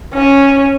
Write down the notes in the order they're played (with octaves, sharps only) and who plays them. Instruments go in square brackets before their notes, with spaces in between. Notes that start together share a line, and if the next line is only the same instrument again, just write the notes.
[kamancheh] C#4